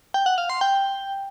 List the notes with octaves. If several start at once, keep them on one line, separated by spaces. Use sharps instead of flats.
G5
F#5
F5
C6
G5